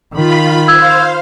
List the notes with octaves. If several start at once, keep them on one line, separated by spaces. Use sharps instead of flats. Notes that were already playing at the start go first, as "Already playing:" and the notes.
D#3 F4 B5
C5 F5 E6 G#6